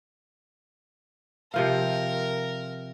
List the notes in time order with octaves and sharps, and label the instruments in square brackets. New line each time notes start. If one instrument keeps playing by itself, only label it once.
[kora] C3 F3 F5 [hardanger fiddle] A#4